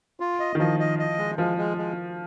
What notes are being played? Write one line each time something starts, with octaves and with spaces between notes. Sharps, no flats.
F4
D#5
D#3
F3 D#5
D#5
D#5
G#3
F3 G#3
G#3
G#3